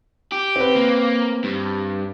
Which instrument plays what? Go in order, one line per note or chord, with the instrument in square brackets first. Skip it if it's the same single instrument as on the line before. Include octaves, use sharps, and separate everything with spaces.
[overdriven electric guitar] G4
[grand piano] C4 B4
[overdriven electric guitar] A#3
G2